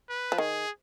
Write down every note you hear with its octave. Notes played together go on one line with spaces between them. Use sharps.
B4
F3
D#3 G#4